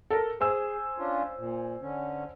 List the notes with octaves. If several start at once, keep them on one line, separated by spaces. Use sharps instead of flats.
A4 A#4
G#4 C5 G#5 E6
C#4 D4 F4
A#2
D3 C#4